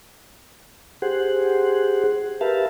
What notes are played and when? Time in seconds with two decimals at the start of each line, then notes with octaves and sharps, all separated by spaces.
1.02 G4 G#4 C5 F#5
2.41 G4 A#4 B4 E5 F5 A5